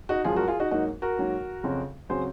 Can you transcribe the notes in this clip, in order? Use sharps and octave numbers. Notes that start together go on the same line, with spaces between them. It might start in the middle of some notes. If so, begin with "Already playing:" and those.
D#4 F#4
F#2 F3 G#3 F4 G#4
F#4 A#4
F4 G#4
D#4 F#4
G#2 F#3 A#3 D#4 F#4
F#4 A#4
G#2 F#3 A#3
F2 C#3 F#3 C4
C#3 F#3 C4 G#4 C5